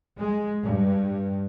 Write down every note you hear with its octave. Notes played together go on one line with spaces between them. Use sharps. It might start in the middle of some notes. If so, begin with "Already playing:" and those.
G#3
G2